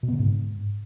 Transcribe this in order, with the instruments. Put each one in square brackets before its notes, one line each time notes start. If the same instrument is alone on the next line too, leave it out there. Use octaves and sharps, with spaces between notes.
[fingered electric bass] B2
B3
C#3
G#2